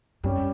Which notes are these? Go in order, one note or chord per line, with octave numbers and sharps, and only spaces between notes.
F#2 G3 C#4 G4